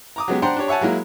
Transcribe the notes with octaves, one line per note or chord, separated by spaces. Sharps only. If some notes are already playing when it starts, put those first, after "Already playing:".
A#5 D6 D#6
F#3 G#3 B3 G4
D4 C5 F#5 G5 A#5 C6
D4 G4 C#5
C#5 E5 F#5 G#5 A5
F#3 G#3 A#3 E4